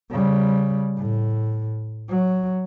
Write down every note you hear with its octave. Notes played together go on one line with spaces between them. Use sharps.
C#3 G3
A2
F#3